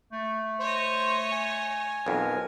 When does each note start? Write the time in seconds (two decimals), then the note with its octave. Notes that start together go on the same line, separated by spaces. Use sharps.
0.12 A3
0.60 C5 C#5 D#5
1.32 G#5
2.06 B1 F2 A#4